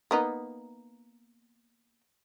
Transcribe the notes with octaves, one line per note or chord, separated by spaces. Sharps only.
A#3 B3 D#4